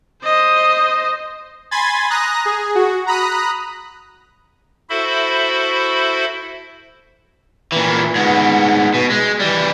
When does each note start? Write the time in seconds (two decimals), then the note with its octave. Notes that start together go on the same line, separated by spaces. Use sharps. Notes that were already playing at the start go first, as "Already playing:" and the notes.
0.24 C5 D#5
1.71 G#5 B5 C6 G#6 A6
2.10 A#5 D#6 F#6 A#6
2.45 G#4
2.75 F#4
3.06 A#5 B5 D#6 F#6
4.90 E4 F#4 A4 C5 E5 B5
7.72 A#2 E3
8.15 G#2 B3
8.94 B2
9.10 G#3
9.40 E3 G3